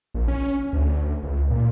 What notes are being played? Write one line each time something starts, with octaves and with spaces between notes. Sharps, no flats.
A#1
C#4
D2
C#2
A#2